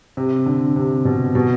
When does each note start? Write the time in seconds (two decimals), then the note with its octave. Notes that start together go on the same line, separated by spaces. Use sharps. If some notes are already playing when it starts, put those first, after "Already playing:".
0.17 C3
0.46 D3
0.76 C3
1.05 B2
1.35 B2